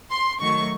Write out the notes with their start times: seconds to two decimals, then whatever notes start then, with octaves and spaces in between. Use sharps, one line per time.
0.11 C6
0.41 D#3 F#3 A3 C#6